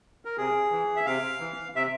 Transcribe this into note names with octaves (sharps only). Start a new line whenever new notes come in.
A#4
C3 G#4
E3
E5
C3 F5
E3
C3 E5